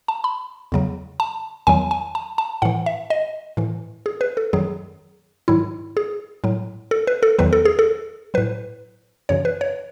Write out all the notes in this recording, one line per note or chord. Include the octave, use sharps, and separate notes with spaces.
A5
B5
E2 C#3 F#3
A5
E2 D#3 F#3 G#5
G#5
A5
A5
A2 E3 F#5
E5
D#5
A2 E3
G#4
B4
A4
F#2 D#3 F#3 G#4
G#2 D#3 F#3 E4
G#4
A2 F#3
A4
B4
A4
E2 D#3 F#3 B4
A4
G#4
A4
A2 F#3 B4
F#2 C#3 E3 C#5
B4
C#5